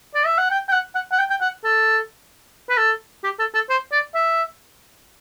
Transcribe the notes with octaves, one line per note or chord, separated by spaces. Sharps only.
D5
E5
F#5
G5
G5
F#5
F#5
F#5
G5
G5
F#5
A4
B4
A4
G4
A4
A4
C5
D5
E5